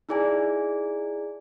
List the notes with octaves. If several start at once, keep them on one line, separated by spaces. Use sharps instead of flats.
D#4 E4 G#4 D5 G#5